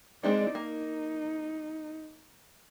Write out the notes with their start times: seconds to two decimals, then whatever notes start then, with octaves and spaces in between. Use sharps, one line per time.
0.23 G#3 C4 D4 D#4 D5
0.55 A#3 D#4